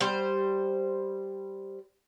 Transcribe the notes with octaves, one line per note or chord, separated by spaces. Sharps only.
G3 C5